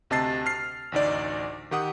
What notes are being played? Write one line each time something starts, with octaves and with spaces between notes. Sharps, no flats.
D2 C3 D#5 A5 A6 C7
F6 C7
A1 D2 D#4 D5
D#3 G4 F#5 D#6